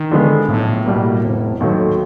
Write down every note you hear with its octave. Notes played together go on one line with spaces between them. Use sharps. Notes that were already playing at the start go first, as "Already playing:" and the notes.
Already playing: D#3
D3 F3 G#3 B3
B1 A2
B2 G3 A#3
F1
D#2 D#3 F#3 A3